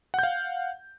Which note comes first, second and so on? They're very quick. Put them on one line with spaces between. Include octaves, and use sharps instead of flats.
F#5 G6 F5